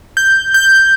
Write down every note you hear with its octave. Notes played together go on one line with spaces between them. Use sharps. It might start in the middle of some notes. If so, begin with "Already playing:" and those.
G6
G6